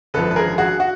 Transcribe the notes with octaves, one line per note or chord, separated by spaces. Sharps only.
G#1 F#2 D3 F3 A4 B4
B4
G#4 A#4
F#4 G#4
F#4